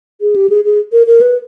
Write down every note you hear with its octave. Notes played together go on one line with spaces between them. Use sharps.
G#4
G4
G#4
G#4
A#4
A#4
B4